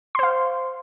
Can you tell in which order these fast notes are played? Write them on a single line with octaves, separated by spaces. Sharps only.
C6 C5 F5